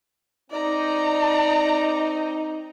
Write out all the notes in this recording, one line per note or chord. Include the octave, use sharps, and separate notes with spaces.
C4 D#4 D5 A#5